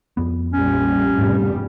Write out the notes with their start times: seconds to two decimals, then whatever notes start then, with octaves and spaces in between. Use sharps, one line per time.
0.17 F2 B3
0.53 A#1 A#2 G3 C#4
1.18 F1 E2 G#2 B2 G3